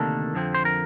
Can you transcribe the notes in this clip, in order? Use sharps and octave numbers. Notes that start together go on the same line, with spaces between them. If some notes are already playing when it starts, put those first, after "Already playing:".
Already playing: D2 C3 D#3 A#3 D4 A4
F2 D3 F3 C4
C5
A#4